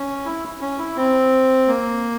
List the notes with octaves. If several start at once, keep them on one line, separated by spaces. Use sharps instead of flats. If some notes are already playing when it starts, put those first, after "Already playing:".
Already playing: C#4
E4
C#4
E4
C4
A#3